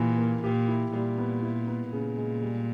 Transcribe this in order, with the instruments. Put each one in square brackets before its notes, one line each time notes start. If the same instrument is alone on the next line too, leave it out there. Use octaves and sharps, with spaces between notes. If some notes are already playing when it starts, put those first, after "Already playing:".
Already playing: [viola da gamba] A#2 [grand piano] E3 E4 G4
[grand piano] A#3
[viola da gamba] A#2 [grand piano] G4
[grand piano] E4
[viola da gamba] A#2 [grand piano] G3
[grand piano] B3
E4
B3
[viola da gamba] A#2 [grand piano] C#3
[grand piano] G#3
G3